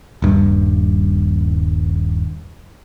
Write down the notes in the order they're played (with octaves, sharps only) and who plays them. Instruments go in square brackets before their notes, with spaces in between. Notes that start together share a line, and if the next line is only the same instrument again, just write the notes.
[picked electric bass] D#1 G2